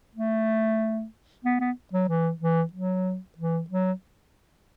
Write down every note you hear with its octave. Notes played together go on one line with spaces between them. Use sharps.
A3
B3
B3
F#3
E3
E3
F#3
E3
F#3